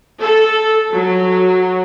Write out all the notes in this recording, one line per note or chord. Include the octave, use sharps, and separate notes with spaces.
A4
F#3